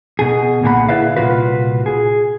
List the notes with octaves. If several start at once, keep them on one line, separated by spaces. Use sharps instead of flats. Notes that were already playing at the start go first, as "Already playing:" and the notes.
B2 G#4
B1 A#2 D3 G#4 F#5 B5
E4 G#4 B4 D5 E5 F5
C2 F2 A#2 F4 F#4 B4
G#4